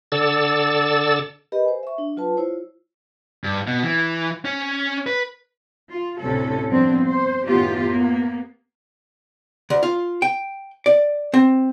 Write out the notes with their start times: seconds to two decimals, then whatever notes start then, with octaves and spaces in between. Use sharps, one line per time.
0.12 D3 A4 D5 E6 A6
1.52 G4 A#4 B4 D#5 B5
1.66 C5 G#5
1.83 E5 C#6
1.98 D4
2.17 F#3 F4 B4 A5
2.37 E4 F4 C5 C#5
3.44 G2
3.67 B2
3.83 E3
4.45 C#4
5.07 B4
5.90 F4
6.20 D2 A2 C3 C#4 A4
6.69 G2 F3 B3 C4 D4
7.03 C5
7.47 F#2 A2 D#3 B3 F4 G4
7.86 A#3 B3
9.70 D2
9.83 F4
10.22 G5
10.86 D5
11.34 C4